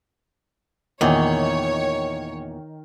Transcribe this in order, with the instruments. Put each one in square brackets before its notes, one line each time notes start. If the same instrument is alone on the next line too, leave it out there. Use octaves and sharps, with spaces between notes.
[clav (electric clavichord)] E2 A#2 [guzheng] D#3 [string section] C#5